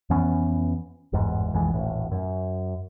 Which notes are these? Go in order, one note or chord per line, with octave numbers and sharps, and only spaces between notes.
F2 E3 B3 C#4
G1 E2 G#2
B1 F2 E3 G#3
D#1 A1 A2
F#2